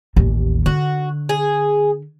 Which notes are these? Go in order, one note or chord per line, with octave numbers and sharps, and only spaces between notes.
A1 D#2
D3 F#4
G#4